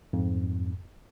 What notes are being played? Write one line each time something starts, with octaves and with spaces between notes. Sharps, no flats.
F2 G#2